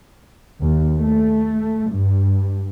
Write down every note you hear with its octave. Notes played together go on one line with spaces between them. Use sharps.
D#2
A3
G2